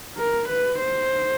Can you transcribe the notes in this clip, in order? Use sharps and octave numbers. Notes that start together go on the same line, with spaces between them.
A#4
B4
C5